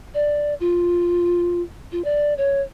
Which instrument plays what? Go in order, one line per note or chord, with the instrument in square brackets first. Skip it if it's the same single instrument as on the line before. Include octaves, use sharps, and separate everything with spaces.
[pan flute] D5
F4
F4
D5
C#5